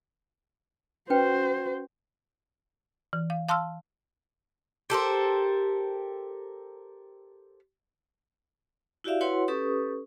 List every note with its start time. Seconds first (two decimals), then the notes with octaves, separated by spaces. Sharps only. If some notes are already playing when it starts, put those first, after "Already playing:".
1.10 C#4 F#4 B4 C5 G5
3.13 E3
3.30 F5
3.48 F5 A5 C6 E6 F6
4.90 G4 A4 A#4 C5
9.04 E4 F#4 G4 D5 E5 F5
9.21 E4 F#4 B4 C#5 F#5 C6
9.48 C#4 G4 A4 B4 C#6 D#6